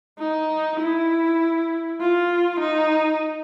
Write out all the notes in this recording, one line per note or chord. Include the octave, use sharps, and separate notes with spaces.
D#4
E4
F4
D#4